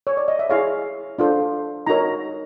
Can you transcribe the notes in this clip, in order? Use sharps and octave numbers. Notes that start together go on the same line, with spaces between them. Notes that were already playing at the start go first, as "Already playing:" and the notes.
C#5
D5
D#5
E5
E4 G#4 C#5 F5
D4 F4 A4 C5
D#4 F#4 A#4 C#5 A#5